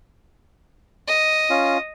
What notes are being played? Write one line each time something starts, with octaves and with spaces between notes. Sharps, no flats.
D#5
C#4 F4